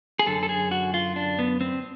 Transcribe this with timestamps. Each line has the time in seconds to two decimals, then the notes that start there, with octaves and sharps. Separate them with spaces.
0.19 G#4
0.26 F#2 D3 A4
0.43 A4
0.49 G#4
0.71 F#4
0.94 F4
1.16 D4
1.39 B3
1.61 C4